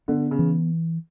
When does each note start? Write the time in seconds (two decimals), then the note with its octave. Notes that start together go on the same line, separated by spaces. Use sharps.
0.08 D3 B3
0.31 C#3
0.39 E3